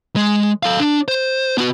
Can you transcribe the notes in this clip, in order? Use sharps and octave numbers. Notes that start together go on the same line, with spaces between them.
G#3
A4 F5
D4
C5
B3 F#4